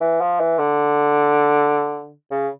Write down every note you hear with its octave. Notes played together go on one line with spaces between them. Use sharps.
E3
F3
E3
D3
C#3